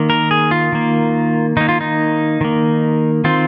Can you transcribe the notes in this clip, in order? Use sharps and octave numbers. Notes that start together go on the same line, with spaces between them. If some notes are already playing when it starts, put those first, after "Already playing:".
Already playing: D#3 A#3
A#4
G#4
F4
D#3 A#3
D#3 A#3 D#4
F4
D#4
D#3 A#3
D#3 C4 F4